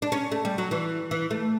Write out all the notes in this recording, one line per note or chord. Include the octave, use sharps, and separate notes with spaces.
D4
C#4
A3
G3
F#3
E3
E3
A3